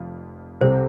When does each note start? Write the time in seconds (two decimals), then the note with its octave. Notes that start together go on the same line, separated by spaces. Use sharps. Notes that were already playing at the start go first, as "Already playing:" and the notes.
Already playing: F1 F2 F4
0.61 C2 C3 G3 C4 A4 C5